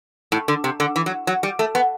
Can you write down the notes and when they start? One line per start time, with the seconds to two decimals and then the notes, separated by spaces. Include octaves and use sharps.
0.32 A2
0.48 D3
0.64 C3
0.80 D3
0.96 E3
1.06 F#3
1.27 F#3
1.43 G3
1.59 A3
1.75 B3